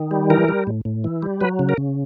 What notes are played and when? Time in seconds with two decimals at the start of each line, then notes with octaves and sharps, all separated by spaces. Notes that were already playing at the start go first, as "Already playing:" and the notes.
Already playing: D#3
0.11 G3
0.30 E3 A#4
0.49 G3
0.67 A2
0.85 A2
1.04 E3
1.22 G3
1.41 F#3 B4
1.59 C#3
1.69 A#4
1.78 C#3